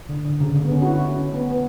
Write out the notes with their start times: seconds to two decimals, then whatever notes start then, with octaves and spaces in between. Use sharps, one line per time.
0.09 D3
0.25 D3
0.40 C#3
0.56 D3
0.65 B3
0.71 C#4
0.82 F#4
0.87 E4
1.10 C#4
1.33 B3
1.50 B3